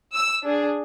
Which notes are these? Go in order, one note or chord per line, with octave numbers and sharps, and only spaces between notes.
E6
D4 G#4